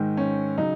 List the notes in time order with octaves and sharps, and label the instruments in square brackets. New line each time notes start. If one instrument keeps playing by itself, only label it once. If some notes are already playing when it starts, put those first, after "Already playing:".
Already playing: [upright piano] G#2 D#3 G#3
C#4
C#3 F#3 D#4